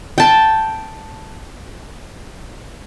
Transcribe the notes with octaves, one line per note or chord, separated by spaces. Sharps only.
G5 A5